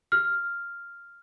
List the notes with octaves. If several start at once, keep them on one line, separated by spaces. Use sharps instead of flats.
F6